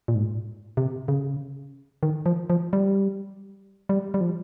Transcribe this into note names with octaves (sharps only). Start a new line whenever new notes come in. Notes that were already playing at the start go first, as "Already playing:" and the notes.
A#2
G#2
C3
C#3
D#3
F3
F3
G3
G3
G3
F3